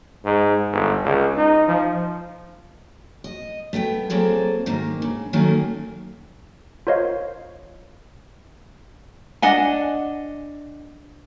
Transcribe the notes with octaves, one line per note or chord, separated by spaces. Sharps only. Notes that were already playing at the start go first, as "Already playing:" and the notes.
G#2
G1
C#2
D#4
F3
D#5
A3 B3 F#5 G5
F#3 A#3 C4 G#4 A4
G#2 D#3 A#3
C#3
D#3 F#3 A3 A#3 C#4
F4 A#4 C5 C#5 D#5 F5
D4 D#5 F#5 G#5